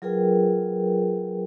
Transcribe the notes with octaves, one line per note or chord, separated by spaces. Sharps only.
F#3 F4 G#4 A#4 B4 G5